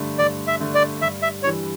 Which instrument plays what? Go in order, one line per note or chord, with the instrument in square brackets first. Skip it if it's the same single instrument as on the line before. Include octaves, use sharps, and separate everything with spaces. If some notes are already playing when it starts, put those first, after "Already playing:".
Already playing: [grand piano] G2 D3 A3 D4
[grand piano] G2 [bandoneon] D5
[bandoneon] E5
[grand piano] D3 A3 D4
[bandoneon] D5
[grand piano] G2 [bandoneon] E5
[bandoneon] E5
[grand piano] E3 G3 D4 [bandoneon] C#5